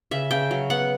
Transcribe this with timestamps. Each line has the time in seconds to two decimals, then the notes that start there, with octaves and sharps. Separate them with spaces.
0.11 C#3 E5
0.31 C#3 G5
0.51 F#3
0.70 B3 F#5